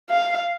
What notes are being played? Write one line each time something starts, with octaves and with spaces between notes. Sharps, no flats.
F5